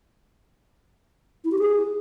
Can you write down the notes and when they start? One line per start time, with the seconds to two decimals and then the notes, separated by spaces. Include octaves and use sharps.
1.44 E4
1.51 G4
1.58 G#4